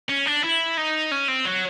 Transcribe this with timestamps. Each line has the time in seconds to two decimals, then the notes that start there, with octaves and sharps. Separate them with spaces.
0.09 C#4
0.26 D4
0.43 E4
0.77 D#4
1.12 C#4
1.28 C4
1.45 F#3